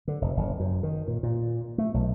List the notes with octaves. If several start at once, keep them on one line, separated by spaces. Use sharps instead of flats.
D3
F1
F#1
F#2
D#3
A#2
A#2
A3
B1